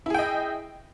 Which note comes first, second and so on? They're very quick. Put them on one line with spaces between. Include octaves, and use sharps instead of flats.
E4 G#4 G5 D#5